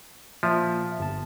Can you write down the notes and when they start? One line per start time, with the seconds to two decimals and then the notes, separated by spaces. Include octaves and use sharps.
0.43 A#2 F3 E5
0.99 G1 A5